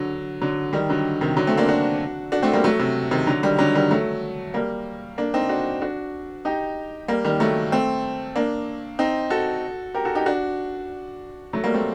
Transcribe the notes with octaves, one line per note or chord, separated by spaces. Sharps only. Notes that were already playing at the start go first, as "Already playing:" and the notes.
Already playing: D3 F#3
D3 F#3
D#3 G3
D3 F#3
C3 D#3
D3 F#3
A3 C4
A#3 D4
D4 F#4
D4 F#4
A3 C4
G3 A#3
F#3 A3
C3
C3 D#3
D3 F#3
D#3 G3
D3 F#3
D#3 G3
F#3 A3
G3 A#3
A#3 D4
C4 D#4
D4 F#4
D4 F#4
D#4 G4
G3 A#3
D#3 G3
F#3 A3
A3 C4
A#3 D4
C4 D#4
F#4 A4
G4 A#4
F#4 A4
D#4 G4
D4 F#4
F#3 A3
G3 A#3
A3 C4